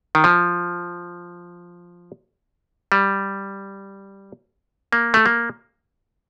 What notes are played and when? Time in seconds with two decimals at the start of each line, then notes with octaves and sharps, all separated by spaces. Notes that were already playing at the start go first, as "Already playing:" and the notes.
0.15 D#3
0.24 F3
2.92 G3
4.93 A#3
5.14 A3
5.26 A#3